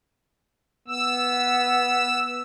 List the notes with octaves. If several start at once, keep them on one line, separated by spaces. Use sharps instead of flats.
B3 E6